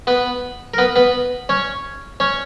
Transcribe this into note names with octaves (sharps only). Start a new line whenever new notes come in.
B3 B4
A#4
B3 B4
B3 B4
C#4 C#5
C#4 C#5